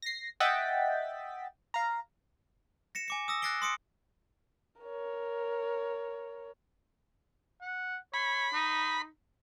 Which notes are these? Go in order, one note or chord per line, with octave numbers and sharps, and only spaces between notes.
A#6 C7
D#5 E5 F#5 G5 A6 B6
F5 A#5
A#6 C#7 E7
G#5 D6 C#7
D#6 E6 A#6
F#6 A6 A#6 C7 D7 G7
C6 D#6 C#7 D7
A#4 C#5
F#5
C#5 B5
D#4